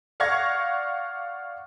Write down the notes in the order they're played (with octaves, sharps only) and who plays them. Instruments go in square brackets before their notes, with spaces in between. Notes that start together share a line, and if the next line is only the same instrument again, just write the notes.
[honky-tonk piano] D5 F5 F#5 C#6 G#6 A#6